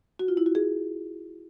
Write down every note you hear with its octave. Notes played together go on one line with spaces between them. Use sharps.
F#4
F4
E4
F#4
G#4